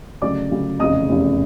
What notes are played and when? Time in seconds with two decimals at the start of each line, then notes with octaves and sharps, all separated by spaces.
0.22 D2 C#3 F#3 D5 D6
0.51 D2 C#3 F#3
0.79 F1 E2 C#3 D#5 D#6
1.09 F1 E2 C#3